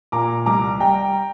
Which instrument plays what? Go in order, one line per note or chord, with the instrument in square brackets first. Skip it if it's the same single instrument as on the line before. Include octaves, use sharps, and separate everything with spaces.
[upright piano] A#2 A#5 D6
C2 A#5 D6
G3 G5 A#5